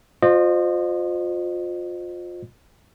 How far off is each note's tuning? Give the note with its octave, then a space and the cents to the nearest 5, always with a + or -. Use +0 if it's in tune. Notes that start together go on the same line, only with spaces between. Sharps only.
F4 +25 C5 +0 D#5 -30